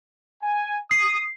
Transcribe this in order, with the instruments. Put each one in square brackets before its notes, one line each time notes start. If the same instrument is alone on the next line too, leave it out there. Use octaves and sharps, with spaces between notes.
[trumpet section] G#5
[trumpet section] D#6 [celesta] C7